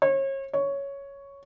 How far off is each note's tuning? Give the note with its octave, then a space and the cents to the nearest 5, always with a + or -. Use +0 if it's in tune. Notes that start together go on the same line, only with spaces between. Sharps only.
C#5 -35
C#5 +5